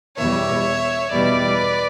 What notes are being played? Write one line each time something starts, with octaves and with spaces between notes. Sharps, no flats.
E2 B2 G3 C#5 E5
E2 B2 G3 B4 D5